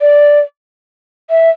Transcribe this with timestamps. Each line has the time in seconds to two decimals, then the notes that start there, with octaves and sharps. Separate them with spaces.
0.01 D5
1.30 E5